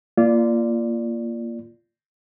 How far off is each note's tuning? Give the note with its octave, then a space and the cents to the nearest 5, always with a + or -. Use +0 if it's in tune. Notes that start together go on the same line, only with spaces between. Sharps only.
A#3 +0 F4 -25 D5 +0